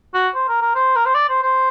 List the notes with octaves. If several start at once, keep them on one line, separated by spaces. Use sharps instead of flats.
F#4
C5
A#4
A#4
C5
A#4
C5
D5
C5
C5